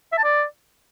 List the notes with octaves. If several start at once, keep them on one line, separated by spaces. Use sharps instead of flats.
E5
A5
D5